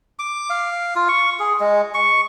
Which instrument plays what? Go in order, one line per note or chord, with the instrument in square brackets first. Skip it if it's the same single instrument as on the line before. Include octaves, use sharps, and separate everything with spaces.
[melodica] D6
F5
F4
C#6
G#4
G#3
C#6